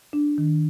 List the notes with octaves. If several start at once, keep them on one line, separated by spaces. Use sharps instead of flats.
D4
D#3